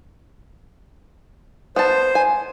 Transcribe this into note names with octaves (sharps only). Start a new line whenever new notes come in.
B3 C5 A5
G#5